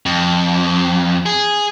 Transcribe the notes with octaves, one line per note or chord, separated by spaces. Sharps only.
F2
G#4